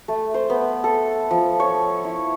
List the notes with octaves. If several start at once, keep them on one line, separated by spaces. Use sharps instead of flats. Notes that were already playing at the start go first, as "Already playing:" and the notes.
A3
C5
B3
A4
F3
C#5
E4